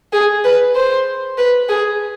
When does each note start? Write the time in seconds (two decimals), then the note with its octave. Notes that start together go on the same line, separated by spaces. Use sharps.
0.13 G#4
0.44 B4
0.75 C5
1.38 B4
1.69 G#4